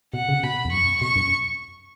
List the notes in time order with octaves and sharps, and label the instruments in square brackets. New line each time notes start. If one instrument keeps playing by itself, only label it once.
[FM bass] B2 [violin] F#5
[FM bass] C#3
[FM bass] B2 [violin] B5
[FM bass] E2
[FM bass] F#2 [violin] C#6
[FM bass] B2 [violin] C#6
[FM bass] F#2